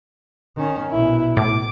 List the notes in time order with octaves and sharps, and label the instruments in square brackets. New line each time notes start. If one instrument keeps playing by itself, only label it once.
[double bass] D#3 C#4
[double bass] A#1 B2 [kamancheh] E4
[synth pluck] A2 [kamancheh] D6